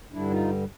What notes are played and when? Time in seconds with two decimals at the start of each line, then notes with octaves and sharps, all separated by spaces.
0.12 G2 D3 G3 D4 E4
0.31 D#4 F4